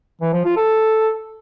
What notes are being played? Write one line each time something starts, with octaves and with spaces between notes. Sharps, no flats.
E3
F3
F4
A4